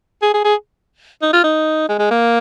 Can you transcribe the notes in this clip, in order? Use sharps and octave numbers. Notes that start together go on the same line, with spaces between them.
G#4
G#4
G#4
D#4
F4
D#4
G#3
G#3
A#3